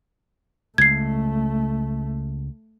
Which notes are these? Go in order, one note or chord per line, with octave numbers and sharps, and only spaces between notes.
C#2 A3 G#6 C7